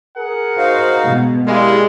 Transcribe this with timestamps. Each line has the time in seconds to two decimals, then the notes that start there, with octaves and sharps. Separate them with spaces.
0.16 G#4 A#4 F#5
0.58 D#4 F#4 C5 F5
1.05 B2 G#3
1.47 G#3 A#3 E4 G4 G#4 A#4 D5